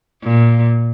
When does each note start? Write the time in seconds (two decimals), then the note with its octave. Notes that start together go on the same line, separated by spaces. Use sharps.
0.23 A#2